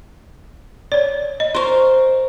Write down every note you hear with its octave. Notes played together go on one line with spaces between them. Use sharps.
C#5 D5
D#5
A#4 C5 C6 C#6